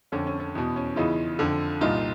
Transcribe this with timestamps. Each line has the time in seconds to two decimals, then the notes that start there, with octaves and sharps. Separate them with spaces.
0.12 F2 D3 C#4
0.27 C#4
0.40 C#4
0.55 E2 B2
0.76 C#4
0.96 E2 C#3 E3 D#4 F4
1.39 F2 D3
1.81 C2 A#2 D#4 F4